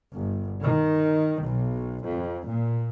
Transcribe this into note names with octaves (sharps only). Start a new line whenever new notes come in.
G1
D#3
B1
F2
A#2